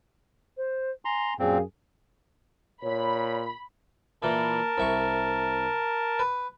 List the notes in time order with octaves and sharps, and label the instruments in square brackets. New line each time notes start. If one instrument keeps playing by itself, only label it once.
[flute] C5
[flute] G#5 [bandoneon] A#5 C6
[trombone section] F#2 G#4 [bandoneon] A#2 C4 [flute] F5
[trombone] A#2 [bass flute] C#5 [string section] B5
[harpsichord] A#2 E3 [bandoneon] A#4 A5
[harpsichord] C2 E5 C#6
B4